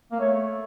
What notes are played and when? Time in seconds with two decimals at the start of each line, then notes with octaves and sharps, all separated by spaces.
0.12 A#3
0.20 A3 C#5